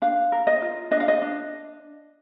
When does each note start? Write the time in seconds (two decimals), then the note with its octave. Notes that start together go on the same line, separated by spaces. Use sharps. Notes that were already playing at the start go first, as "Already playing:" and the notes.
0.02 D4 F5
0.32 A#4
0.47 D#5
0.62 F4
0.91 D4 D#5
1.00 F5
1.08 D#5
1.22 D4